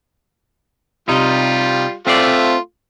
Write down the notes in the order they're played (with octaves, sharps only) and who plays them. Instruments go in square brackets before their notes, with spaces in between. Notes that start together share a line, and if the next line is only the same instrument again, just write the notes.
[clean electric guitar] C3 D#4 [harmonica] G3 F4
[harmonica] A3 F4 [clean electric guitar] C4 C5 D5